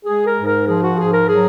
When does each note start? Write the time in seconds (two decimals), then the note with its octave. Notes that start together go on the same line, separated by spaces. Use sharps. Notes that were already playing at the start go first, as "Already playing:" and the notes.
0.06 G#3 G#4
0.27 A#4
0.37 G#2
0.47 A#4
0.67 F3 G#4
0.82 F#4
0.98 G#2 G#4
1.13 A#4
1.28 F#3 G#4